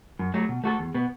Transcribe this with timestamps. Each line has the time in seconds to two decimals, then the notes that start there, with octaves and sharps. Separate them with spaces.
0.19 F#2
0.34 F#3 A3
0.49 B2
0.64 A3 F#4 A4
0.79 E2
0.94 B2 B3